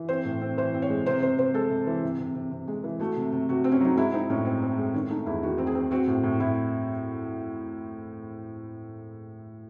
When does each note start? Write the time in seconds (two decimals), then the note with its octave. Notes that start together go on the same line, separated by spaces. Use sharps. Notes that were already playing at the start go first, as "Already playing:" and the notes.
Already playing: E3
0.09 C4 C5
0.25 A2
0.41 C4
0.57 E3 C5
0.74 C4
0.82 C#5
0.90 G#3
1.06 C3 C5
1.22 C3 C5
1.38 C3 C5
1.54 G#3 A4
1.70 C3
1.87 E3
2.04 C3
2.19 C3
2.35 C3
2.52 C3
2.68 G#3
2.84 E3
2.99 A3 F#4
3.17 C3
3.32 C3
3.49 C3 F#4
3.64 C4
3.72 C#4
3.81 F#3 D#4
3.96 G#3 E4
4.13 C4 D#4
4.30 A2 C#4
4.45 C4
4.62 C4
4.78 G#3
4.94 D#3 C#4
5.10 A3 D#4
5.26 E2 E4
5.43 D#3 F#4
5.58 C4
5.67 G#4
5.75 C4
5.91 C4 F#4
6.07 A2
6.23 A2
6.40 A2 E4